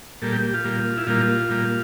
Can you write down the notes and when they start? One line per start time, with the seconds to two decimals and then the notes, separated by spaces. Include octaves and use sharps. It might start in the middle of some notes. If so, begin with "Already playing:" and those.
0.22 A#2 G3 A#3 A4
0.33 G4
0.43 G4
0.54 F4
0.64 A#2 G3 A#3
0.97 E4
1.07 A#2 G3 A#3 F4
1.49 A#2 G3 A#3